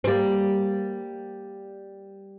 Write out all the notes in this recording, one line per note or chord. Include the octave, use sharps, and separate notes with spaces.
C4
G3 A#3